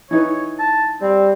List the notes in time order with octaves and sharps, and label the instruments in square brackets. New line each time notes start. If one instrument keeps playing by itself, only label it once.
[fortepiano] E3 D#4 B4 [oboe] C#5
[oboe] A5
[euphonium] G3 [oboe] C4